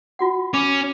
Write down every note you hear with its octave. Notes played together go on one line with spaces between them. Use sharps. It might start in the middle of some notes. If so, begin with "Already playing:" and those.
F4 F#4 F#5
C#4 D6